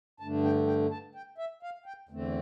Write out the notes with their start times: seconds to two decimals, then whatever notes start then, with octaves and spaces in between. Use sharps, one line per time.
0.20 G2 D3 A3 D4 A5
0.44 G5
0.67 G5
0.91 A5
1.15 G5
1.38 E5
1.63 F5
1.86 G5
2.09 E2 D3 A3 C4